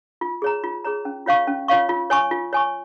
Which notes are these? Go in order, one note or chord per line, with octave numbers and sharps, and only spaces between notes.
F4
G#4 C#5 A#5
F4
G#4 C#5 A#5
C#4
F4 C#5 F5 C#6
C#4
F4 C#5 F5 C#6
F4
C#5 G#5 C#6
F4
C#5 G#5 C#6